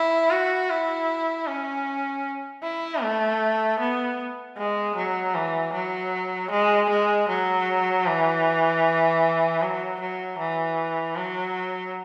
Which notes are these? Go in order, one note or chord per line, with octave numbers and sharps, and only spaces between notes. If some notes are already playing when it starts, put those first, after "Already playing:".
Already playing: E4
F#4
E4
C#4
E4
A3
B3
G#3
F#3
E3
F#3
G#3
G#3
F#3
E3
F#3
F#3
E3
F#3